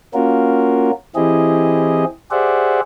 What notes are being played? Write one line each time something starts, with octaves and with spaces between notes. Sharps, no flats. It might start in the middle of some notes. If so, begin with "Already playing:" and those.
A#3 C#4 F4 F#4 A#4
E3 C4 E4 G4 G#4 D#5
G4 G#4 C5 D5 E5 F#5